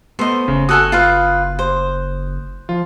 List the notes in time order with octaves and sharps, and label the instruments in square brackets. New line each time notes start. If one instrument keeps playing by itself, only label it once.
[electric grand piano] A3 B3 [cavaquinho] C5 D#5
[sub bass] F#1 [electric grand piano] C#3
[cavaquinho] F#4 A4 G#5 [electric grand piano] D#6 F#6
[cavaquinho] F4 B4 F5
C5
[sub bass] F3 [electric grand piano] F4